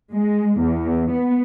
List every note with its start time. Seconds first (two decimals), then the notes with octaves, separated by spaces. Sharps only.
0.13 G#3
0.60 E2
1.12 B3